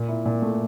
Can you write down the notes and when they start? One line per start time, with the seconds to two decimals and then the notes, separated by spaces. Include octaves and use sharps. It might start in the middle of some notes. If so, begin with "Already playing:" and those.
Already playing: A#2
0.08 E4
0.25 A#2
0.42 A3